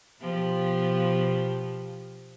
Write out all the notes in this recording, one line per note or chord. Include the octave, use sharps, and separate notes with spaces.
B2 F3 G4